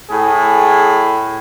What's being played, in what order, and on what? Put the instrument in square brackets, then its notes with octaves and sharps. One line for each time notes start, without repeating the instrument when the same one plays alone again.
[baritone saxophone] A2 [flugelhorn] G#4